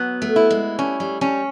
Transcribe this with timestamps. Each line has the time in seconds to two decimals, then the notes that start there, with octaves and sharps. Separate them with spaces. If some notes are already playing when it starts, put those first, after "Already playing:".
Already playing: F#3 B3
0.22 A3
0.36 E4
0.50 G#3
0.79 G3 C#4
1.00 G3
1.21 G3 C#4